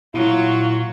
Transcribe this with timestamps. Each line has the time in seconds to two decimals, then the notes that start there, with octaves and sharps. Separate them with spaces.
0.14 A#2 F#3 E4 F4 C#6